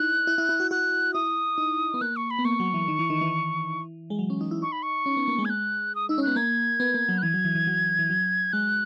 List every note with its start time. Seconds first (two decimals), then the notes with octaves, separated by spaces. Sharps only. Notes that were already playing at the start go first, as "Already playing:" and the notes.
Already playing: D#4 E4 F#6
0.27 E4
0.38 E4
0.49 E4
0.60 F#4
0.71 F#4 F#6
1.14 E4 D#6
1.58 D#4
1.94 B3
2.01 A#3 F#6
2.16 C#6
2.31 B5
2.39 B3
2.45 A#3 C#6
2.60 F#3
2.74 E3
2.88 D#3
2.99 E3
3.10 D#3
3.21 E3
4.10 G#3
4.19 F#3
4.30 C#4
4.41 D#4
4.51 E4
4.62 D#4 C#6
4.72 B5
4.83 C#6
5.06 C#4
5.17 B3
5.28 A#3
5.38 G#3
5.45 G#6
5.50 F#6
5.95 D#6
6.09 D#4 E6
6.18 C#4
6.23 B3 F#6
6.36 A#3 G#6
6.80 B3
6.94 A#3
7.09 F#3
7.18 F#6
7.22 E3 G#6
7.34 F#3
7.45 E3
7.55 E3
7.67 F#3
7.99 E3
8.10 F#3
8.53 G#3 F#6